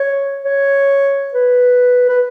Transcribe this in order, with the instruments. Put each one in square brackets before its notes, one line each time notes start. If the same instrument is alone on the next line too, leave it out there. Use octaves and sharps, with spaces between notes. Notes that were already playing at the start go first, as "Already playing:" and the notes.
Already playing: [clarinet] C#5
C#5
B4
B4